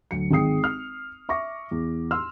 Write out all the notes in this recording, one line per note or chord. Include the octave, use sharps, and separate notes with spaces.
D2 F#3 C#7
G#1 G#3 G5 D#6 C7
F6
E5 C#6 D6 A#6
E2
C6 E6 F6